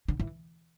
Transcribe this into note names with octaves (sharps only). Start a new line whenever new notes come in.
D3
E3